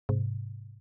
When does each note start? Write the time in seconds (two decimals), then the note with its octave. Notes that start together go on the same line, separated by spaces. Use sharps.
0.09 G#2 C3